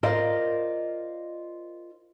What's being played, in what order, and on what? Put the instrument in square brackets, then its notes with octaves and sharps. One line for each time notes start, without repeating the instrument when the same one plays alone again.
[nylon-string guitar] F4 A#4 C5 D5 D#5 F5